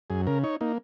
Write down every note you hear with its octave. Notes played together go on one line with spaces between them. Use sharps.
F#2 G#4
C#3 A#4
D#4 C#5
A#3 D#4